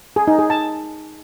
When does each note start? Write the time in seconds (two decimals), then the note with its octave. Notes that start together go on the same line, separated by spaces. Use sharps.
0.16 G#4
0.28 D#4
0.39 G#4
0.50 A5